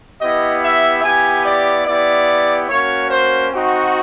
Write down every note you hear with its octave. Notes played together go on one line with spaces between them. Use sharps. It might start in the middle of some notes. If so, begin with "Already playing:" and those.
B3 E4 G4 D#5
E5
B3 E4 G4 G#5
D5
B3 E4 G4 D5
A#3 C#4 F#4 C#5
C5
C4 D#4 F#4